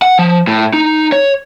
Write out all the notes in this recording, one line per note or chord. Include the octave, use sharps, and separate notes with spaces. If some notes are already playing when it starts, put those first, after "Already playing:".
F#5
F3
A2
D#4
C#5